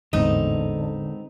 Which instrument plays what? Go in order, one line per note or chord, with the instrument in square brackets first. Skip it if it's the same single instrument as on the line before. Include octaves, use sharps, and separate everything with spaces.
[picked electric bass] A1 E2 G#2 [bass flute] D3 [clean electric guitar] G#3 B3 C4 [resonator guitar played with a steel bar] D#4